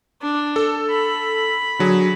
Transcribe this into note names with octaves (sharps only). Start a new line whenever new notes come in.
D4
A4
B5
D3 F#3 G#4